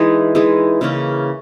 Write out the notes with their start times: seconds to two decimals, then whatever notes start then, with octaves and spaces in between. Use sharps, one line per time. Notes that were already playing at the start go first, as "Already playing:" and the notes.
Already playing: E3 G#3 D#4 G#4
0.35 E3 G#3 D#4 G#4
0.81 C#3 E3 A#3 C#4